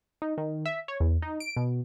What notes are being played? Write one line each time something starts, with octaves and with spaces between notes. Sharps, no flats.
D#4
D#3
E5
C#5
E2
D#4
D7
B2